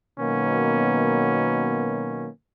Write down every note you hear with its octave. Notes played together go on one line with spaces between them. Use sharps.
B2 D#3 F#3 A#3 B3 C#4